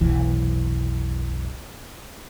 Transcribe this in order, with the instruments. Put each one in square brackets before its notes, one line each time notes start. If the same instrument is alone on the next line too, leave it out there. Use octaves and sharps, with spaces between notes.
[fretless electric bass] F1 B1 E3